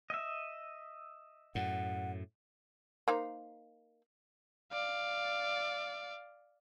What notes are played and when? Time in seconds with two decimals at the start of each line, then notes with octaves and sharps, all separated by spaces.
0.10 D#5 E5
1.55 F#2 A2 F#5
3.08 A#3 D#4 C5
4.72 D5 F5